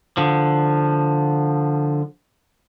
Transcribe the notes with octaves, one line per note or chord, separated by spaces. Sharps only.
D3 F3